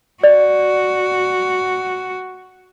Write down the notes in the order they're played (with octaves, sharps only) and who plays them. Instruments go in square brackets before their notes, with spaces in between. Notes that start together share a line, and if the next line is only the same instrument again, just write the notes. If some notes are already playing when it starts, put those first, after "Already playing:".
[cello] F#4 [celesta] D5